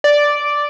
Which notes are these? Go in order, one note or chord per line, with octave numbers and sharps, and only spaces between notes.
D5